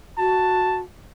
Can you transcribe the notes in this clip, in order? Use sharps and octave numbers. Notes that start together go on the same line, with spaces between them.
F#4 A5